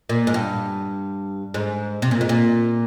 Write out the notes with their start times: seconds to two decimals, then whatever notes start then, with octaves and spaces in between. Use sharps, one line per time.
0.09 A#2
0.27 G#2
0.34 G2
1.54 G#2
2.02 C3
2.11 A#2
2.21 G#2
2.29 A#2